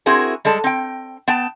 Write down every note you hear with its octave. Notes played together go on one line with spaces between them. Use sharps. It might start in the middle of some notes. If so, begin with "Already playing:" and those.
C4 E4 F#4 G#4 A#4
G3 G#3 A4 A5
C4 G5
B3 G5 A5